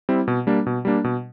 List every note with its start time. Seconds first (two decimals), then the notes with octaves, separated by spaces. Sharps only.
0.09 G3 C4 E4
0.28 B2
0.47 G3 A#3 D4
0.66 B2
0.85 G3 A#3 D4
1.04 B2